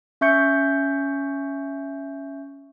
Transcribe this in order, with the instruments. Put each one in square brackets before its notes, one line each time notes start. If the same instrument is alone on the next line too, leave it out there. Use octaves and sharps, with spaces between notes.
[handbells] C#4 E5 C#6 G6 C#7